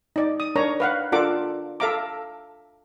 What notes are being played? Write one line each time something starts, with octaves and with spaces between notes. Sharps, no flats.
D#4 D5
D#6
D4 A#4 C#5 A#5
B4 F5 F#5
D4 F4 A4 A#4 F#5 D6
A4 E5 F5 A#5 D6